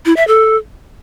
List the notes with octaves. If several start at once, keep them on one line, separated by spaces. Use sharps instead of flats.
E4
E5
A4